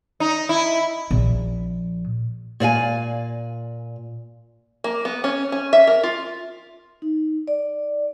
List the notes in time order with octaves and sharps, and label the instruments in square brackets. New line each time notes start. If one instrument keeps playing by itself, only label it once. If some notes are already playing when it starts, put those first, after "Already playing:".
[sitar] D#4
E4
[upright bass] A#1
[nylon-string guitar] A#2 D5 F5 G#5
[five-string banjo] A#3
B3
C#4
C#4
E5
A#4
F4
[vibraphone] D#4
D5